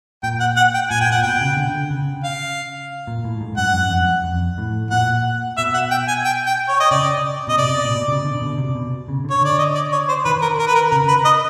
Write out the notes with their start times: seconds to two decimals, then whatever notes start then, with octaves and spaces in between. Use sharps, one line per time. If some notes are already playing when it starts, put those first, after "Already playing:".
0.23 A#2 G5
0.40 F#5
0.57 F#5
0.74 G5
0.90 A#2 G#5
1.01 G5
1.07 A#2 F#5
1.23 B2 G5
1.41 C#3
1.57 D3
1.90 C#3
2.24 F5
3.07 A#2
3.24 A2
3.41 G#2
3.57 F#2 F#5
3.74 F#2
3.91 F2
4.24 F2
4.58 A2
4.91 A#2 F#5
5.57 B2 E5
5.74 F#5
5.91 G5
6.08 G#5
6.25 G5
6.47 G5
6.69 C#5
6.80 D#5
6.91 C#3 D5
7.47 B2 D#5
7.58 C3 D5
7.85 A#2
7.91 B2
8.08 C#3
8.25 D3
8.42 B2
8.58 C3
8.75 B2
9.08 C#3
9.25 D3
9.31 C#5
9.41 D3 D5
9.58 D#5
9.75 D5
9.92 C#5
10.09 C5
10.25 D#3 B4
10.42 A#4
10.59 A#4
10.67 B4
10.75 A#4
10.92 C#3 A#4
11.08 B4
11.25 D#5